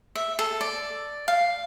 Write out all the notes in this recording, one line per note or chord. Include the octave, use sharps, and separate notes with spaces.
E5
A4
D5
F5